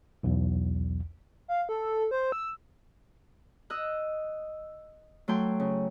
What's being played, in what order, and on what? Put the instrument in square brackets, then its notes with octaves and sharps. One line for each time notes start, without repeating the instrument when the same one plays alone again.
[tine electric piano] B1 E2
[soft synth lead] F5
A4
C5
E6
[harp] D#5 E6 F#6
F#3 A3 G5 C6
C#3